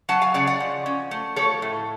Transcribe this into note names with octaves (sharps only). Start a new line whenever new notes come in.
F#3 F#5 A5
F5 G#5
C#3 D5 F#5
D5 F#5
F3
C#4
A3
F3 A4 C#5
A2